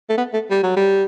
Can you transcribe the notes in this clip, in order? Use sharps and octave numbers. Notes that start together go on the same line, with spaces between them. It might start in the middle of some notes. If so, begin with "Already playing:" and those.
A3
B3
A3
G3
F#3
G3